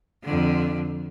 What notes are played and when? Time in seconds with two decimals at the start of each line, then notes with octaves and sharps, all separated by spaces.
0.23 F2 D3